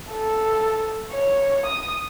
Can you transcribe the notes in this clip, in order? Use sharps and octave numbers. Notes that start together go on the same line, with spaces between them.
A4
C#5
D#6